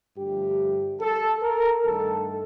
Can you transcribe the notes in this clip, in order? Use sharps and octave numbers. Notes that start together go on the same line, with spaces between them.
G2 D3 F3 A3 G4
A4
A#4
G2 D#3 A3 A4